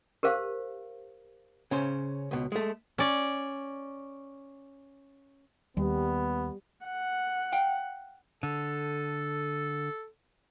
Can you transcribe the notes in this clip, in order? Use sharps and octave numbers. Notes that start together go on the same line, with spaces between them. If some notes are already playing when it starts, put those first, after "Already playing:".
G4 A#4 C5 F5
C#3 C#4 C5
C#2 B2
G#3 A3
C#4 D5
D#2 G3 B3
F#5
F5 G5
D3 A4